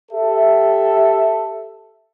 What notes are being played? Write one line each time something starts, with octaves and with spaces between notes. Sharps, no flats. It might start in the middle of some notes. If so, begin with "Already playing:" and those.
G4 A4 E5